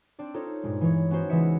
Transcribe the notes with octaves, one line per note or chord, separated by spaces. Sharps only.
C4 D4 D5
D#4 F4 A4 C5 C#5
G2 A#2 G#3
E3 C#5
B3 C#4 D#4 F#4 C5
C#2 E3 B3 D#5 E5 C#7